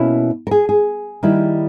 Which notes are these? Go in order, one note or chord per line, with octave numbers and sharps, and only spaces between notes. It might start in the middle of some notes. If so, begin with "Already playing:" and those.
Already playing: B2 A#3 C#4 E4
A#4
G#4
G#4
D#3 G3 A#3 E4